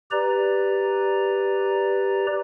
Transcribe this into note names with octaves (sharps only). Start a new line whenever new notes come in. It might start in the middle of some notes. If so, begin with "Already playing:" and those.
G4 B4 D5 A#5